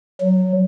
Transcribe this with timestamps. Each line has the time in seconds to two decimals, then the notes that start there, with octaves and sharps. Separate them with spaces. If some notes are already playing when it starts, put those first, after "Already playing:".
0.21 F#3